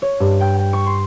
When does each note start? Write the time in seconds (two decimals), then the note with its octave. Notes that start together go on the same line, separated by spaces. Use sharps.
0.02 C#5
0.20 G2
0.40 G5
0.58 G5
0.73 C#6
0.86 C6